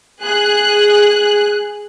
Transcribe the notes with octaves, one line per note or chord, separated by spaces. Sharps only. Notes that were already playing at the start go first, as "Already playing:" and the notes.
G#4 F#6